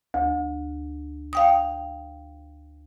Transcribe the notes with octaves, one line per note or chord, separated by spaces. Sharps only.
D2
F5 G5 D#6